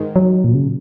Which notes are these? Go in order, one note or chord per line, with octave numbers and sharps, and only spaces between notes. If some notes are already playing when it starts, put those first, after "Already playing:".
Already playing: G#2 D#3 G#3
F#3
A#2
C#3